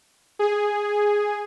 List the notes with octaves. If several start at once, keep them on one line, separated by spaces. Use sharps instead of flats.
G#4